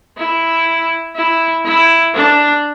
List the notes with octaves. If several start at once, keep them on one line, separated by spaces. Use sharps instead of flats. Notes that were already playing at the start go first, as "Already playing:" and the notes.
E4
E4
E4
D4